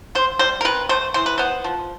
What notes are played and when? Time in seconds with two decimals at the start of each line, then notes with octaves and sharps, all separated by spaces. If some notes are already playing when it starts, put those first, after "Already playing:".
0.15 C3 C5
0.39 G3 C5
0.61 A#4
0.65 C3 B4
0.89 A3 C5
1.14 E3 C5
1.26 B4
1.38 B3 C5
1.64 F3